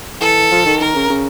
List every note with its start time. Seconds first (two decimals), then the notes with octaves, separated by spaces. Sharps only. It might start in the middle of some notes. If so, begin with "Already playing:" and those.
0.21 E3 A4
0.51 F3
0.66 D#3
0.80 D#3 A#4
0.95 C#3
1.10 C#3